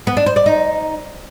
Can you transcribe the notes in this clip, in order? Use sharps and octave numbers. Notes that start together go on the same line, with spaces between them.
B3
D4
C5
D5
D#4